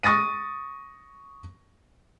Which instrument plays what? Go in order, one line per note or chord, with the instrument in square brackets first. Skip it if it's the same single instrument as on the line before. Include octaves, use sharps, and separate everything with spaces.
[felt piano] C#6 D#6 A6 A#6 D#7